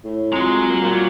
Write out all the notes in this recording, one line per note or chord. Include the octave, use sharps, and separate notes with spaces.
A2
F2 G#3 F#4 A#5
A#3
A#2